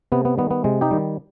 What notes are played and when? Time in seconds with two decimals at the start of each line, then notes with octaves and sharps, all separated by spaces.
0.12 C3 B3
0.25 B3
0.38 D#3 G3 B3
0.51 B3
0.64 C3 G#3
0.81 D#4 G4
0.91 D#3 G3